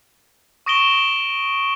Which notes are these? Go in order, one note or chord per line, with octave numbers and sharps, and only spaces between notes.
C#6 D#6 A#6 D7 E7 G7